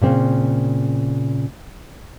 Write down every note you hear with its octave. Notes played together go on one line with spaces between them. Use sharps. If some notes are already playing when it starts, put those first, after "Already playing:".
A#2 C#3 C4